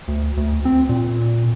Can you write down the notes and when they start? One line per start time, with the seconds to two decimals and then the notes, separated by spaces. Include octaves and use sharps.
0.08 D2
0.37 D2
0.65 C4
0.89 A#2